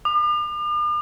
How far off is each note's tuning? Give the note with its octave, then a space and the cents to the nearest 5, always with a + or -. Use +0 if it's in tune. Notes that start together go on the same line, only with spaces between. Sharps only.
D6 +45